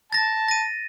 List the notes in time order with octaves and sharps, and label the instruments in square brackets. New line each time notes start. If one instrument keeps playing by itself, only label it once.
[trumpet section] A5 [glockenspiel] A6 A#6
[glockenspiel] A#6 D#7